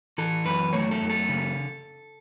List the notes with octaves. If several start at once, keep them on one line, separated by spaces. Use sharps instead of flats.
E3 A4
F#2 B4
A3 C#5
A4
F#2
A4
C#3